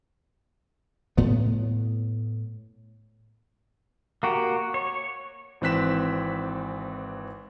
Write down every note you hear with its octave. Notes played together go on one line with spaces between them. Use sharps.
A2 A3 B3
A#3 F#4 G4
C#5
G#1 E3 C4 F#6 B6 E7